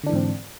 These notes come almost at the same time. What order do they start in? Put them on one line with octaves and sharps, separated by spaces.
D3 D4 E3 G#2 C4